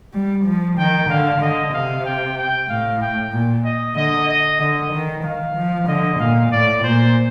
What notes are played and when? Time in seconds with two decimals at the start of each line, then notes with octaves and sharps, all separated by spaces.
0.13 G3
0.45 F3
0.78 D#3 G5
1.10 D3 F5
1.41 D3 D#5
1.73 C3 F5
2.06 G5
2.37 G5
2.68 A2 F5
3.01 G5
3.33 A#2
3.65 D#5
3.96 D3 D#5
4.28 D#5
4.60 D3 D#5
4.92 D#3
5.23 D#3 F5
5.56 F3
5.88 D3 D#5
6.19 A#2 F5
6.51 A2 D5
6.83 A#2 C5